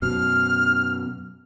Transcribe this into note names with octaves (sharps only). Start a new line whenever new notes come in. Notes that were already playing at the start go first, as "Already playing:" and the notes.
F#2 B2 F6